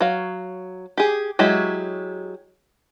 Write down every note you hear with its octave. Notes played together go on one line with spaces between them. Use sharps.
F#3 F5
G4 G#4
F#3 G#3 E4 G4